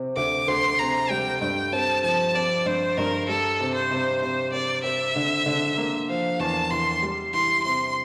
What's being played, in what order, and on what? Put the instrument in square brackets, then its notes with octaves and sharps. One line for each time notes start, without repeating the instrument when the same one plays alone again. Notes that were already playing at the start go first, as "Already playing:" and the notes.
Already playing: [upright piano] C3 C4
[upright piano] D2 [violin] D6
[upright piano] D2 [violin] C6
[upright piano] C3 [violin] A#5
[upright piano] G3 [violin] G5
[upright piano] G2 [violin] G5
[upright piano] C4 [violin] A5
[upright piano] F3 [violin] A5
[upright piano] C4 [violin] D5
[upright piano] G2 [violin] C5
[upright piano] G2 [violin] A#4
[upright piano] G3 [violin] A4
[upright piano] C3
[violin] C5
[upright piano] C3
[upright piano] C3 [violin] C5
[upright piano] C4 [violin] D5
[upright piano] C4 [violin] E5
[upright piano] D3
D3
A#3
[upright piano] F3 [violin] F5
[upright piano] E2 [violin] A5
[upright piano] E2 [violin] C6
[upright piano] G3
[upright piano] E3 [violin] C6
[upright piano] C3 [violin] C6